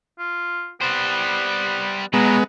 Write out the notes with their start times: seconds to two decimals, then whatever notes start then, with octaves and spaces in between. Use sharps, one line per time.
0.19 F4
0.81 G3 B3 C5
2.14 B2 F#3 G#3 B3 A#5